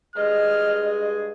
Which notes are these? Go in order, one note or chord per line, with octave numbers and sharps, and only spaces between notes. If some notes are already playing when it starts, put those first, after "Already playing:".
G2 G#3 G#4 D#5 F6